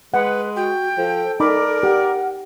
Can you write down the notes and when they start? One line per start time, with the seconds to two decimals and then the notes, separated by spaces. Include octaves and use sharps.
0.14 G#3 B4 F#5
0.56 F#4 G5
0.97 F3 A4
1.40 D#4 A#4 D5 B5 D6
1.83 G4 F#5